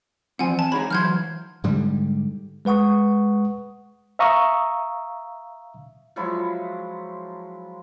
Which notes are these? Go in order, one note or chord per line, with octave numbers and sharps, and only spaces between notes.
E3 F3 C4 F#5 G#5
A5
D#4 G#4 C#5 B5
E3 F#3 C6 F6 G6 G#6
G#2 D3 G3
G#3 B4 F#5 C#6 D#6
E5 F5 A#5 C#6 D#6 E6
F3 F#3 G#3 E4